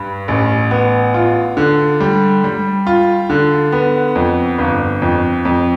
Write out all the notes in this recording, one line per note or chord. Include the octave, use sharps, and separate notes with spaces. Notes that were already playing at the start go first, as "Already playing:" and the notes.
Already playing: G2
A1
B3
F4
D3
G3
G3
F4
D3
B3
F2
G1
F2
F2